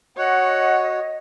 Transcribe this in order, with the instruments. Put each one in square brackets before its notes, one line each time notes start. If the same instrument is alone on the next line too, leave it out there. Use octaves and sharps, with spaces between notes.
[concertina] F#4 [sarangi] C#5 [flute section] D#5 [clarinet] F#5